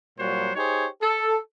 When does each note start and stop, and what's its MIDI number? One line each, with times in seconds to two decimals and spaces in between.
0.19 0.51 46
0.19 0.51 54
0.19 0.51 55
0.19 0.51 66
0.19 0.51 72
0.19 0.51 73
0.56 0.87 63
0.56 0.87 67
0.56 0.87 68
0.56 0.87 72
0.56 0.87 73
1.02 1.36 69